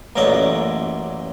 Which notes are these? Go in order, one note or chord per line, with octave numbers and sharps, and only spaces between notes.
A1 F#2 A#2 F#3 D5 D#5